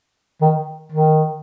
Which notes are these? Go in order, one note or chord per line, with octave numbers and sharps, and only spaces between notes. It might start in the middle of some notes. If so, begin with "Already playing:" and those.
D#3
D#3